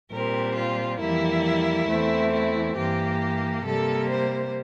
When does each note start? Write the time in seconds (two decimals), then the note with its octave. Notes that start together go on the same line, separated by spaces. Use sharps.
0.11 A#2 G3 C4 A#4
0.56 F4
1.00 F2 E3 G3 A#3 E4
1.88 E2 E3 A3 C4
2.32 E4
2.76 G2 E3 A#3 G4
3.65 C3 G3 A#3 A4
4.09 C5